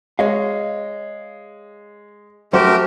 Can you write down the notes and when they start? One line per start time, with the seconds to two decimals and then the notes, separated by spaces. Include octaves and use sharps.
0.19 G#3 C#5 D#5 F5
2.53 F#2 A3 F#4 G4 A#4 C5